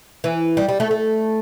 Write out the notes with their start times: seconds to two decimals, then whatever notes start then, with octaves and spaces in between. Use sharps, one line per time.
0.24 E3
0.57 G3
0.68 G3
0.80 A3
0.91 A3